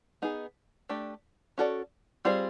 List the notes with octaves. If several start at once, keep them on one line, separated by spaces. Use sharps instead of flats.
B3 D#4 G#4
A3 D4 G4
C#4 F#4 A4 D5
G3 C4 F4 G#4 C5